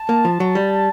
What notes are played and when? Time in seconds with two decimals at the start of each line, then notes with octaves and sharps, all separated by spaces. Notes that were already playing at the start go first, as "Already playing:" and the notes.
Already playing: A5
0.09 A#3
0.25 F3
0.40 F#3
0.55 G3